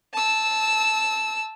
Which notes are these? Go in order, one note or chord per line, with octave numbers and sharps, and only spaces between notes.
A5 E6